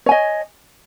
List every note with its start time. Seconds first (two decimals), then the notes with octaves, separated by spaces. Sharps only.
0.06 C#5
0.09 G#5
0.11 D#5